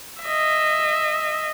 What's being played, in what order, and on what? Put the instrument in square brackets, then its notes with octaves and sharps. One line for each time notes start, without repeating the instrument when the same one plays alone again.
[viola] D#5 E5